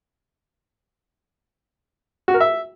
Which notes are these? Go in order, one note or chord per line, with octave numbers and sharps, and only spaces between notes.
F#4
A#4
E5